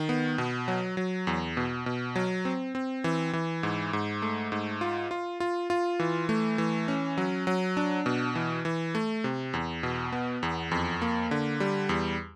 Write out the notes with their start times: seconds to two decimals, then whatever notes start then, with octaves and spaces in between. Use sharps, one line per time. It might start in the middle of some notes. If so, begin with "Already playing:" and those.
Already playing: D#3
0.09 B3
0.38 B2
0.68 F#3
0.97 F#3
1.27 E2
1.57 B2
1.86 B2
2.16 F#3
2.45 C4
2.75 C4
3.04 E3
3.33 E3
3.63 G#2
3.93 G#2
4.22 A3
4.52 G#2
4.81 F4
5.11 F4
5.40 F4
5.70 F4
6.00 E3
6.29 A3
6.58 E3
6.88 C#4
7.18 F#3
7.47 F#3
7.77 D4
8.06 B2
8.35 E3
8.65 E3
8.95 A3
9.24 C3
9.54 E2
9.83 B2
10.12 B3
10.43 E2
10.71 F2
11.02 A#3
11.31 D3
11.60 G3
11.89 E2